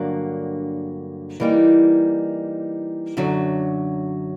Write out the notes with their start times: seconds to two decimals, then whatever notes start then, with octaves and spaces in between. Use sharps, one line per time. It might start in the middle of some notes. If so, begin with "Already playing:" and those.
Already playing: G2 D3 F#3 A#3
1.40 E3 G3 A#3 D#4
3.17 F#2 D3 F#3